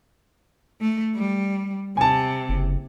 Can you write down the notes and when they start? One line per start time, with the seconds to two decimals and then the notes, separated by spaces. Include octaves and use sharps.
0.81 A3
1.15 G3
1.97 C3 G#5 A5
2.49 F#1